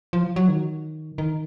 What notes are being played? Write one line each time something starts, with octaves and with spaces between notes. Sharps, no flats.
F3
F#3
D#3
D#3